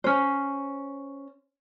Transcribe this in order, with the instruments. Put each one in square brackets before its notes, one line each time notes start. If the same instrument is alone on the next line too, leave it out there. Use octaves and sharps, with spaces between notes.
[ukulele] C#4 C5